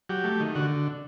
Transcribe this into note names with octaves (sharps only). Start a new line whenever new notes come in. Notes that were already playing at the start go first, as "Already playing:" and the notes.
F#3 G4
A3
D#3
D3 F#4